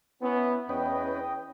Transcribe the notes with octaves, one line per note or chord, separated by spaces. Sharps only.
B3 C#4 E4
E2 C#4 B4 D#5 G5 D#6